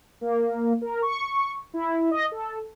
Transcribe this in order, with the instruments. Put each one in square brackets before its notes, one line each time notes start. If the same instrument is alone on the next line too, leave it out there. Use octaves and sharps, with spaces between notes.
[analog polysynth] A#3
A#4
C#6
E4
D#5
A4